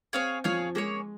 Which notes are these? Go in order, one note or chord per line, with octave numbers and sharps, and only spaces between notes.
C4 G#4 C#5 F5 G#5
F3 G#4 C#5 F5 G#5
G#3 A#3 C#4 G#4 C#5